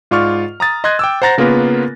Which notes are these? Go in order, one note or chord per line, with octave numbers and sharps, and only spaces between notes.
G#2 F4 D5 C#6 F6
A#5 D#6 A6
D#5 C6 D#6 F#6 G#6
G5 D6 E6
C5 F#5 A#5 A6 A#6
C#3 A#3 B3 F4 A#4 B4